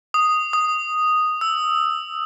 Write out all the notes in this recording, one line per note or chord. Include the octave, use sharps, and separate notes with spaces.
D#6
D#6
E6